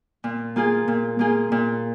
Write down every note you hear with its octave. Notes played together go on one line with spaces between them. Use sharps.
A#2
A#3 F4 G#4
A#2
A#3 F4 G#4
A#2